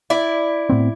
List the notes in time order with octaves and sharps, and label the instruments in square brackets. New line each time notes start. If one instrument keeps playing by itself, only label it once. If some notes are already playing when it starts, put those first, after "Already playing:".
[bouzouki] E4 D5
[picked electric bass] A2 B3 C4